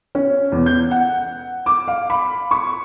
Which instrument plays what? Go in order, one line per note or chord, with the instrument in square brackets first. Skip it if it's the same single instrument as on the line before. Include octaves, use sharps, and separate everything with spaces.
[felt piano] C#4
E2
G6
F#5
D6
F5
B5
C#6